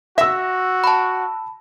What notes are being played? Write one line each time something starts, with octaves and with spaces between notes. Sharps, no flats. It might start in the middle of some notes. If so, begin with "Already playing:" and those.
F#4 E5 E6 A#6
A5 B5